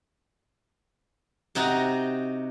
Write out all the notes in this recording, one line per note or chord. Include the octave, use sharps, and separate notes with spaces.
C3 D#4 F#4 A#5